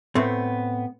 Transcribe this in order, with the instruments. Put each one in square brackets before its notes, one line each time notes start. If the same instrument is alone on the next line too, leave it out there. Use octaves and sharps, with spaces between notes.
[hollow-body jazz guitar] A2 A3 B3 C4